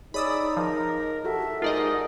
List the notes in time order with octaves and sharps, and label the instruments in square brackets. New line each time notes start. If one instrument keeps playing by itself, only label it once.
[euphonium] D#4 [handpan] G#4 C#5 [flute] D5 [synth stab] B5 D#6 E6
[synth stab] F3 [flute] A#4
[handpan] F#4 G4 A4 [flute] E5
[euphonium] G#2 [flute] D#4 [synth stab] F4 D5 D#5 [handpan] A#4